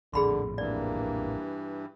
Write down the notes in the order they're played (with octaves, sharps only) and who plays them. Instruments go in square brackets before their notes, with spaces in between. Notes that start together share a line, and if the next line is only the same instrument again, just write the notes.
[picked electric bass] A#1 F2 A2 [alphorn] D3 [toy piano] G#4 B5 C6
[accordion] G2 E3 [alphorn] A#3 [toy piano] D5